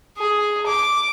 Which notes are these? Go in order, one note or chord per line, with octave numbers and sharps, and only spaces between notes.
G#4
D6